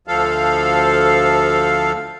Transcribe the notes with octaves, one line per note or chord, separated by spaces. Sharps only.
D2 F3 A4 F5